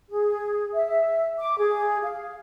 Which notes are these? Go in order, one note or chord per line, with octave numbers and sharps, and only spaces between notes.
G#4
E5
D6
G#4
F5